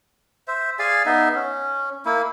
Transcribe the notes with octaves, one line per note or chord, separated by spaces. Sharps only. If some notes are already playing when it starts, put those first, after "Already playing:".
C5 E5
G#4 D5 F5 G#5
B3 D#4 E5
C#4
A#3 E4